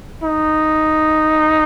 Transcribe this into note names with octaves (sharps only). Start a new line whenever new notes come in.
D#4